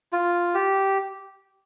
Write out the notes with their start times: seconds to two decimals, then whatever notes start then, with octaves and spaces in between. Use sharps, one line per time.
0.12 F4
0.55 G4